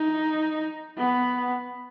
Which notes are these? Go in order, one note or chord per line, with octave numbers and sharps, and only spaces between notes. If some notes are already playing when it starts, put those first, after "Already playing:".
Already playing: D#4
B3